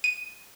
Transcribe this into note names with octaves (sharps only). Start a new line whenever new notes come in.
D#7